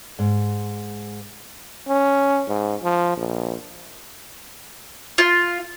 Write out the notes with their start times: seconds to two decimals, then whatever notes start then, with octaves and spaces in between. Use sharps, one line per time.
0.19 G#2
1.88 C#4
2.48 G#2
2.83 F3
3.17 A#1
5.18 F4